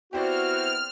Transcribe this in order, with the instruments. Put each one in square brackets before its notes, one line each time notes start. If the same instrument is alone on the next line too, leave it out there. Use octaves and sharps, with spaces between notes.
[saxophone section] B3 C4 E4 [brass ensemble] F#4 [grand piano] G4 C5 D5 [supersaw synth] F6